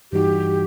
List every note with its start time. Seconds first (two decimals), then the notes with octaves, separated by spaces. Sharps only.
0.12 G2 E3 G3 D#4 F#4 G4